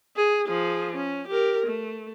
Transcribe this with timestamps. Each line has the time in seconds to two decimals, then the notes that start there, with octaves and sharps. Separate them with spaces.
0.16 G#4
0.48 F3 G#4
0.95 C#4
1.28 G4 A#4
1.66 A3